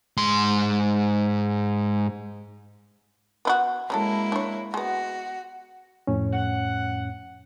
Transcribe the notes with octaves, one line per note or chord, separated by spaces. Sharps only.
G#2 C6
B3 E4 F#4
C#3 F#3 G#3 A#3 E4 A4
D4 C#5
G#3 B3 F#4
F2 A2 C#4
F#5